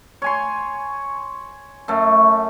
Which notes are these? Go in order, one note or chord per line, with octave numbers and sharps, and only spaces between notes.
C#5 G#5 C6
F#2 A3